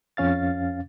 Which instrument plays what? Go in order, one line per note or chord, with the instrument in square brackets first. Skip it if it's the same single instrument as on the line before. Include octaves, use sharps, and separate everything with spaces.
[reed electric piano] F2 C#4 F5 A6